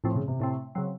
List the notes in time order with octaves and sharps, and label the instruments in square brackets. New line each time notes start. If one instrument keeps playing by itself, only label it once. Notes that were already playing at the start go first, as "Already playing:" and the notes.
[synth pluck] A2 A3 C4 [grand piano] F3
[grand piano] C#3
C3
[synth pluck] A2 A3 C4
C#3 F#3 C4